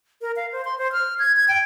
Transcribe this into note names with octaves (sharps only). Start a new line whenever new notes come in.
A#4
F5
C5
C6
C5
F6
G#6
G#6
G5